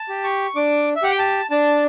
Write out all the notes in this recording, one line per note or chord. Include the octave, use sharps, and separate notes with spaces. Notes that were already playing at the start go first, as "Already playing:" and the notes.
Already playing: A5
G4
C#6
D4 D6
E5
G4 F#5
G5
A5
D4 A5